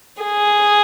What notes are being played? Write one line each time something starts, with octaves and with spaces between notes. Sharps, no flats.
G#4